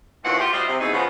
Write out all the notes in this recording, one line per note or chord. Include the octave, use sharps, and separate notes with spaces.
D#2 A2 E3 F4 F#4 F#5
F4 G4
G3 F4 F#4 C5 D#5 E5
C3
B2 E3 D#4 G#4
C#3 F3 B3